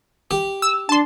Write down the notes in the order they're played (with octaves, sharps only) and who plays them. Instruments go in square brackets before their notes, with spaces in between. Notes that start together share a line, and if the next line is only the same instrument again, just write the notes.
[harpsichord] G4
[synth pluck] E6
[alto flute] D4 [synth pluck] A5 C6